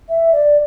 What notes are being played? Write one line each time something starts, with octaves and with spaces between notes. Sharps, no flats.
E5
D5